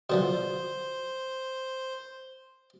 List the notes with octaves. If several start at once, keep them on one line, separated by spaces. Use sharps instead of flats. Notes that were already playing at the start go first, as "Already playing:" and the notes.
B2 D3 F3 C5